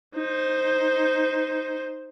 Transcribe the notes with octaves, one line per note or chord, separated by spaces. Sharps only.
D#4 C5